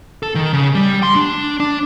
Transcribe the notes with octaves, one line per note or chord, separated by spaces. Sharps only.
A4
D#3
C#3
G3
C6
D4
D4